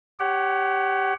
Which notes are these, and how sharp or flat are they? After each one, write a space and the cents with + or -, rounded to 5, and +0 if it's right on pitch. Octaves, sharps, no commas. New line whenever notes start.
G4 +5 C#5 +0 F#5 +30